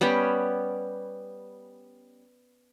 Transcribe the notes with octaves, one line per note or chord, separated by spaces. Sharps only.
G3 B3 C#4 G4